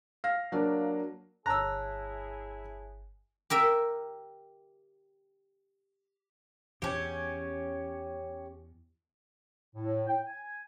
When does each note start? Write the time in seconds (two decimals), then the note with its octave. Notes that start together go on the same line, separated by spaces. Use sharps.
0.24 F5 A#6
0.52 F#3 A#3 D4
1.46 G1 E4 G#4 C#5 A5 A#5 E6 F#6
3.50 G4 A#4 E5
6.82 E2 C#4 G4
9.76 A2
10.07 G5
10.27 G#5